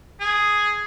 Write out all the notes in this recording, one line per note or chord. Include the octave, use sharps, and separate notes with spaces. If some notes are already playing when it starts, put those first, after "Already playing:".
G#4